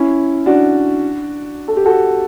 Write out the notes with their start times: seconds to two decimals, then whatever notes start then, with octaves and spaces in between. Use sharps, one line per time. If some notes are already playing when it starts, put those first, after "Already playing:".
Already playing: C#4 E4
0.46 D4 F#4
1.68 A4
1.77 G4
1.86 F#4 A4